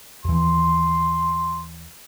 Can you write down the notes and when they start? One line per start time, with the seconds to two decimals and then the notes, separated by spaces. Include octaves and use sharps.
0.25 D#2 E3 C6